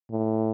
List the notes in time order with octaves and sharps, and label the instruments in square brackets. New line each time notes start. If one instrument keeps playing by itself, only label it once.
[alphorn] A2